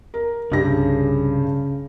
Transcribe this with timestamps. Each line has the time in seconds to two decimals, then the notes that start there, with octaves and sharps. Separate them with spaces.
0.14 A#4
0.52 C2 G2 C#3 G4 A#6